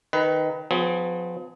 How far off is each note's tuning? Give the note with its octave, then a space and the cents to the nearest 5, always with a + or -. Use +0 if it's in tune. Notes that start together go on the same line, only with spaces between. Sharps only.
D#3 +0 B4 +15 D#5 +35
F3 +35 B3 +45 G#4 +0